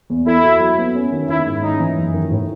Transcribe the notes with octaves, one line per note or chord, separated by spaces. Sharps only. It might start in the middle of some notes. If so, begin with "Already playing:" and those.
E2
E4 A4
F#4
F#3
B3
C#4
D#3
D#3 E4
G#2
C#4 D#4
E3
F#2
D#3
A2